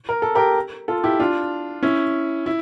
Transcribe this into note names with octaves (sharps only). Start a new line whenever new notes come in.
A#4
A4
G4 A#4
F4 A4
E4 G4
D4 F4
C#4 E4
E4